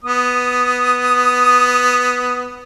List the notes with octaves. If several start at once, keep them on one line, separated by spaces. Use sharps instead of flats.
B3 D#6